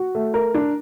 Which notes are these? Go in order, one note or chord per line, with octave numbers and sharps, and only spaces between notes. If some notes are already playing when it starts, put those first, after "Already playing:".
Already playing: F#4
A3
A#4
D4